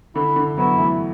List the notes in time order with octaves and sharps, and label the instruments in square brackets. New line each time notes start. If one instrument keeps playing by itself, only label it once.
[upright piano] D3 [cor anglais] E4
[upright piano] D3
[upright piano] F#3 B3 [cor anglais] E4
[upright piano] E3 A3